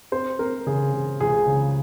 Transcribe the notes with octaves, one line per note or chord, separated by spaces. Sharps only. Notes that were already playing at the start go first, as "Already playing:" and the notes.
C4 C5
C4 A#4
C#3 G#4
C#3
C#2 G#4
C#3